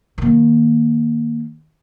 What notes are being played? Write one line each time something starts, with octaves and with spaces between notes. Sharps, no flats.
D#3 A#3